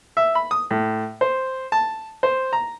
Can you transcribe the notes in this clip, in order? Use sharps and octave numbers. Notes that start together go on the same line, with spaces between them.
E5
B5
D#6
A2
C5
A5
C5
A#5